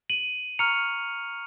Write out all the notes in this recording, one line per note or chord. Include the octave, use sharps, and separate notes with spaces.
D#7 F#7
A#5 C#6 F6 C#7 F7